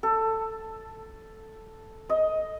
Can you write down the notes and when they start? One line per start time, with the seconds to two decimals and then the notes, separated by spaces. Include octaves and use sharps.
0.03 A4
2.09 D#5